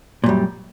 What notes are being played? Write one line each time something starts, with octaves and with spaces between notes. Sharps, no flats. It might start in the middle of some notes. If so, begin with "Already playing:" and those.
F#2 A#2 G3